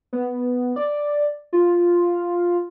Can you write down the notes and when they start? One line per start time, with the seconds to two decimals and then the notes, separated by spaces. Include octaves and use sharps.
0.13 B3
0.76 D5
1.53 F4